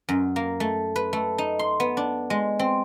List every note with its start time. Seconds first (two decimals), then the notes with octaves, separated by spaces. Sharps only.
0.09 F#2
0.36 A#3
0.60 A3
0.96 B4
1.13 A3
1.38 D#4
1.59 C6
1.80 B3
1.97 D4
2.30 G#3
2.59 C4